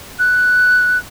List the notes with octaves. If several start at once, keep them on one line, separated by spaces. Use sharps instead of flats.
F#6